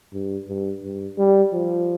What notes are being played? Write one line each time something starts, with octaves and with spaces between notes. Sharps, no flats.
G2
G2
G2
G3
F3